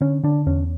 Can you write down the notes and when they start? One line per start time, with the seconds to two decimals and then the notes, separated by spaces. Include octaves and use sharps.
0.01 D3 C#4
0.23 D3 D4
0.46 E2 C#4